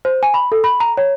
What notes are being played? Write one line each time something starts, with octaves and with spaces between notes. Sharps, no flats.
C5
G#5
B5
A4
B5
A#5
C#5